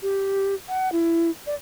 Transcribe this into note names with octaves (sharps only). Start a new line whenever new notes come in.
G4
F#5
E4
D5